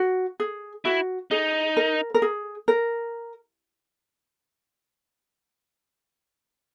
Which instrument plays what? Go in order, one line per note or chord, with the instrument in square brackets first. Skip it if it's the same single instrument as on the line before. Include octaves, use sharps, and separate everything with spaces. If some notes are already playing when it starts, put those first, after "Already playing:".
Already playing: [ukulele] F#4
G#4
[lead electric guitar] E4 [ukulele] F#4
[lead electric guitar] D#4 [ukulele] G#4
[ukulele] A#4
A#4
G#4
A#4